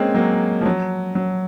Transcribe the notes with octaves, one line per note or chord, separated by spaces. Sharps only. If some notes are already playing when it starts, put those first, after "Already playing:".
Already playing: G#3 A#3 C4 C#4
F#3 A#3
F3
F#3
F#3